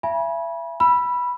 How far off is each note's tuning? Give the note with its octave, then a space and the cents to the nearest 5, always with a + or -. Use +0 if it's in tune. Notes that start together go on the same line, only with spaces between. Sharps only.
E5 +35 G#5 +0 B5 -30
B5 -10 E6 +25